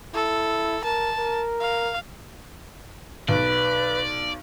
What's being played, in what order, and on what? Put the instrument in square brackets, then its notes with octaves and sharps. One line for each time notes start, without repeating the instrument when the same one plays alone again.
[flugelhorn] E4 [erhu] A4
[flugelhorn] A#4 [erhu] A5
[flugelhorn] A#4
[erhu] F5
[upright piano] B1 [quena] B4 [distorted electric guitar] D5